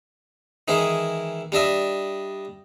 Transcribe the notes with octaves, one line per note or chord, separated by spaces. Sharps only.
D#3 E3 G#3 E4 G#4
G3 D4 D#5 E5